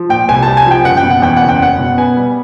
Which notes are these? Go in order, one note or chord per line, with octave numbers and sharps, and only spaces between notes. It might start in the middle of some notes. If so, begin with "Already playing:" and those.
Already playing: F3
A#2 G5
C2 G#5
C2 A5
G#5
F3 G5
F#1 F#5
G5
B2
F#5
E2 G5
F#5
F#1
G5
F#1 F#5
B2
B3 G#5
G3